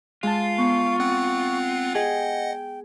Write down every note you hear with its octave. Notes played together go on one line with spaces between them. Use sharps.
G#3 F4 F5 A5
B3 C#6
C4 F#5 F#6
G#4 D#5 F#5 G5